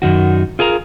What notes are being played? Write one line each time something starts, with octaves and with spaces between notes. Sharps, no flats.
F#2 D#3 F#4
F4 G#4 A#4 D#5 A#5